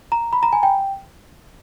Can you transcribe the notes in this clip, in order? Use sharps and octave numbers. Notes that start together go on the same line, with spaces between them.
A#5
B5
A#5
G#5
G5